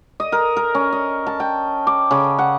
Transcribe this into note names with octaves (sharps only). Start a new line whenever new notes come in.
D#5
A#4
A#4
C#4
D#5
A5
G5
D6
C#3
F#5